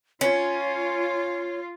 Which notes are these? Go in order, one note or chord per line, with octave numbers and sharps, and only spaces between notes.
C#4 F4 C#5